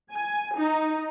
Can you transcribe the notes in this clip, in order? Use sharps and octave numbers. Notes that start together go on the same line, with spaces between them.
G#5
D#4